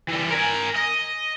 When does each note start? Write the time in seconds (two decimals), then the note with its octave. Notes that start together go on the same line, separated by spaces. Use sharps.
0.08 E3 G3
0.31 A#4 G#5
0.76 D#5